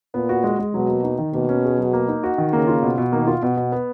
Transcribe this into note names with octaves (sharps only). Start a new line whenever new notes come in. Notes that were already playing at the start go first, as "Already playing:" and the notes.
A#2 B3
F#4
G#3
G#3
B2 F#3
A#3
D#4
D#3
B2 A#3
C#4
G#4
F#3
A#3
D#4
F#4
D#3
C#3 A#3
F4
B2
B2
D#3 A#3
F4
B2 B3
B2
B3